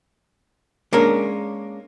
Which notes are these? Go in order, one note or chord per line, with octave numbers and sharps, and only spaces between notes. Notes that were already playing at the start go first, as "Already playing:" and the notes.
G#3 A#3 C#4 D4 A#4